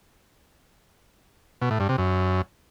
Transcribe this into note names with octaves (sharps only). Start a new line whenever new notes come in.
B2
A2
G2
C3
F#2